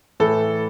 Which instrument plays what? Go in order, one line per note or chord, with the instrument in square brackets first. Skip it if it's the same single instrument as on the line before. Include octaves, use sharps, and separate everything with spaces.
[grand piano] A2 E3 A4